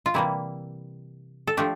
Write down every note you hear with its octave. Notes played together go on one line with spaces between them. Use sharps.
F4
C3 E3 G3 A#3 E4
A4
F3 A3 D4 G4